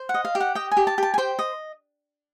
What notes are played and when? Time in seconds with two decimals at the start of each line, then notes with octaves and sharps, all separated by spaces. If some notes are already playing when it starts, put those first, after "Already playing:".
Already playing: C5
0.09 F#5
0.14 D#5
0.25 F5
0.35 G4
0.40 F#5
0.55 D#5 G5
0.71 G#5
0.77 G4
0.87 A5
0.98 G4 A5
1.14 G#5
1.18 C5 G5
1.39 D#5